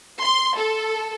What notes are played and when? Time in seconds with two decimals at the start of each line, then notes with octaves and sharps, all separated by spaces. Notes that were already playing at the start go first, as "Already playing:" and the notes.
0.22 C6
0.57 A4